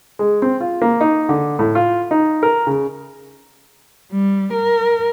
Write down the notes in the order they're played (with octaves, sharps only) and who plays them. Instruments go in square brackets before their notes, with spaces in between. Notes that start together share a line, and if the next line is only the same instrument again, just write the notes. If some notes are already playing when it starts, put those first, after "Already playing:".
[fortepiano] G#3
C4
F4
A#3
D#4
D3
A2
F4
D#4
A#4
C#3
[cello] G3
A#4